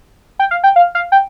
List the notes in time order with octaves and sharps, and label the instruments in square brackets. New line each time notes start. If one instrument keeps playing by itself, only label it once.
[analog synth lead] G5
F5
G5
F5
F5
G5